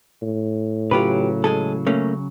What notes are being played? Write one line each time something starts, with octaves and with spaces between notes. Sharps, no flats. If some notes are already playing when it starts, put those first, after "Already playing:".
A2
C#3 F#3 F4 G4 B4
G#3 G#4 A4
A3 A#3 C#4